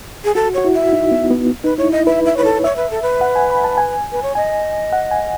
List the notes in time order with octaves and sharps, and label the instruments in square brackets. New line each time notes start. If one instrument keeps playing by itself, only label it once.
[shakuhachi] G#4
[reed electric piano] F#4 [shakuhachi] A4
[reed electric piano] F#4 [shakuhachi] C#5
[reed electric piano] E4
[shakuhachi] E5
[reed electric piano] D#4
B3
B3
[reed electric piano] D#4 [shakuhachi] B4
[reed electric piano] E4 [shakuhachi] C#5
[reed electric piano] E4 [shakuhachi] D#5
[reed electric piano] B4 [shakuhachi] E5
[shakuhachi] E5
[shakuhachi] B4 [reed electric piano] C#5
[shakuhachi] A4
[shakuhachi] C#5 [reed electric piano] E5
[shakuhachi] B4
A4
B4
[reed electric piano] F#5
G#5
B5
A5
G#5
[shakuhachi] B4
C#5
[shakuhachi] D#5 [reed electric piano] G#5
[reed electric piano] F#5
G#5